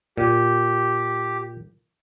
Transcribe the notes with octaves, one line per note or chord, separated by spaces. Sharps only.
A#2 G4